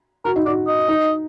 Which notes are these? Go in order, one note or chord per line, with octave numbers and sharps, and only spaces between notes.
F#4 A#4
D#4
F#4 D5
D#5
D#4